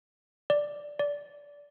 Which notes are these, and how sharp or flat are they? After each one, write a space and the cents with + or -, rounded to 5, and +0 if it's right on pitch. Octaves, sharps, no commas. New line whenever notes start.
D5 +0
D5 -20